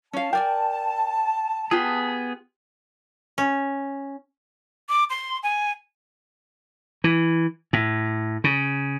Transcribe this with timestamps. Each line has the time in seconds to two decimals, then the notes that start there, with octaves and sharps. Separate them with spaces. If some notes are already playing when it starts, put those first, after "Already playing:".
0.13 C#4 F5 A5
0.33 A#4 D5 G5 G#5
1.71 B3 F4 G4 G#4
3.38 C#4
4.89 D6
5.10 C6
5.43 G#5
7.04 E3
7.73 A2
8.44 C#3